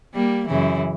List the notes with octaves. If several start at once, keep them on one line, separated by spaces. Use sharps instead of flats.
G3 A#3
F#2 C#3 E3